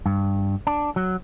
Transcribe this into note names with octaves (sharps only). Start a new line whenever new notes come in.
G2
D4
F#3